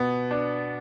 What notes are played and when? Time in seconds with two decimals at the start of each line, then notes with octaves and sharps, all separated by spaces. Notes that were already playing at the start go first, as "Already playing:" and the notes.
Already playing: B2 B3
0.31 D4